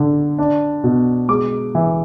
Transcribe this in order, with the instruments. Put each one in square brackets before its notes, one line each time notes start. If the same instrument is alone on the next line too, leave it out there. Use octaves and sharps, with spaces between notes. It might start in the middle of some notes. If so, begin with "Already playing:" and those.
Already playing: [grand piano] D3
D4
B2
G#3 D6
E3